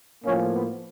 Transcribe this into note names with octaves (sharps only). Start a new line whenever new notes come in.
A2 F3 A#3 C#4
B3